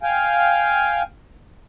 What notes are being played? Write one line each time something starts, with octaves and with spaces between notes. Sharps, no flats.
F5 G5 G#5